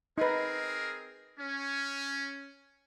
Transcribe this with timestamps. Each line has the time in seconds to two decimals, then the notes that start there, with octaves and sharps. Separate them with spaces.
0.18 C4 D#4 G#4 A#4 B4
1.38 C#4